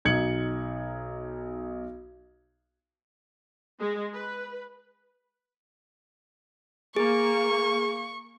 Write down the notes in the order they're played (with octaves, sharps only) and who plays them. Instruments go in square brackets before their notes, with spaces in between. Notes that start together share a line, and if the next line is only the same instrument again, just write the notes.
[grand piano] B1 D#4 G#6 C#7 F#7
[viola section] G#3
B4
[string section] A#3 [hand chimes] G#4 [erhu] C#6